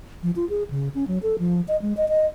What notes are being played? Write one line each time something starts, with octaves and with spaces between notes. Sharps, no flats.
F3
F4
G#4
C#3
C#4
F#3
A4
F3
D#5
G#3
D#5
D#5